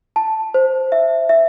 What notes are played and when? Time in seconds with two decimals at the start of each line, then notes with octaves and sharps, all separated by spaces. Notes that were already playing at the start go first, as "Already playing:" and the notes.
0.16 A5
0.54 C5
0.92 E5
1.29 E5